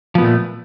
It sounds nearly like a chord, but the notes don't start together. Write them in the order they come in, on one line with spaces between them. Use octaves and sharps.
F3 B3 A#2 A3